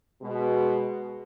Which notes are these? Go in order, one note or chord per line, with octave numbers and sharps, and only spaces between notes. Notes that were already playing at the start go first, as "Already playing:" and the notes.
B2 G#3